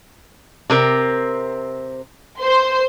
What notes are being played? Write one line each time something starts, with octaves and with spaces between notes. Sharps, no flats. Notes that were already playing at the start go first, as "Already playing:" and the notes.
C3 C4 A#4
C5 C6